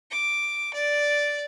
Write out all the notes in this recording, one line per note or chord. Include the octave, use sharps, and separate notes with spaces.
D6
D5